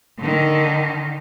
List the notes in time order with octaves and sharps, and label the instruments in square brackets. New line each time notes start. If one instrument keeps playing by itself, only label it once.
[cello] D3 D#3